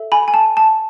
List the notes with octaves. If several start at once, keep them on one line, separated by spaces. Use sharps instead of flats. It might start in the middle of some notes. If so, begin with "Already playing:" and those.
Already playing: A4 E5
G#5 B5
G#5
A5
A5